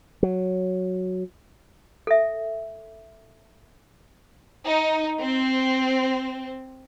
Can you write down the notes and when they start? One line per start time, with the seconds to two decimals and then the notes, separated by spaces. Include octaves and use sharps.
0.23 F#3
2.07 A4 E5
4.66 D#4
5.21 C4